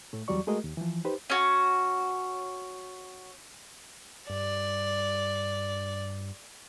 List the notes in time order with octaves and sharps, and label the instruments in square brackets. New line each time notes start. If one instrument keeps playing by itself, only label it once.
[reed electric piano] A2 A3
E2 F#3 G3 F#4 D5 C#6
G#3 A3 F#4 G#4 A#4 D#5
D#2
E3 F3
D#4 G4 B4 C5
[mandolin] C#4 F#4
[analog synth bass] G2 [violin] D5